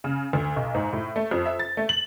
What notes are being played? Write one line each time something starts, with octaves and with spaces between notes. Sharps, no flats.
C#3
D2
B1
G#2
A2
A3
F2
E5
A6
A3
F#7